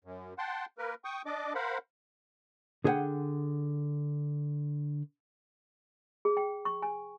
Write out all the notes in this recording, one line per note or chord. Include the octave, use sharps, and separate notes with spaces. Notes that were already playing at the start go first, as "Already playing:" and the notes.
F#2
F#5 G5 A5 C6
A#3 A#4 B4
G5 C#6 D#6
D4 D5 D#5 D6
A#4 C5 F5 F#5 B5
D3 G#4 A#4 E5 F#5 G5
G#4
G5
C#6
G#5